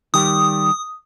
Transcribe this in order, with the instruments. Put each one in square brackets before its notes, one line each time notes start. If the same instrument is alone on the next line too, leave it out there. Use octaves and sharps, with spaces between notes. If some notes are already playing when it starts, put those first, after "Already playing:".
[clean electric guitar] D#3 G3 G4 [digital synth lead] D#6